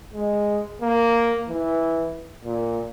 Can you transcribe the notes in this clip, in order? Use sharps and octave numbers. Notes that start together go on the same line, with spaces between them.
G#3
A#3
E3
A#2